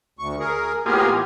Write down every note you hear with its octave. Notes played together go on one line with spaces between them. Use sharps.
D2 C#6
G#4 A#4
A2 A#3 B3 F4 G4 G#4
E3